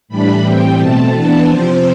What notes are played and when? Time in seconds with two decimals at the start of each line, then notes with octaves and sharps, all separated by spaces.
0.08 A2 E3 G3 D4 B5
0.43 A2 E3 G3 C4 G5
0.78 B2 A3 C4 A5
1.13 E3 B3 D4
1.48 C3 F3 C4 C5